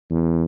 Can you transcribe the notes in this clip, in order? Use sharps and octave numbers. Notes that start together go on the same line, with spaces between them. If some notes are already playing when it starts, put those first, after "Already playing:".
E2